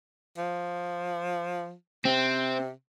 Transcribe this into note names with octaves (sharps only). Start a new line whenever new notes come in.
F3
C3 C4